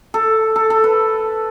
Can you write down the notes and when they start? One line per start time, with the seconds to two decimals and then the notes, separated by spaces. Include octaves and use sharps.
0.14 A4
0.56 A4
0.70 A4
0.84 B4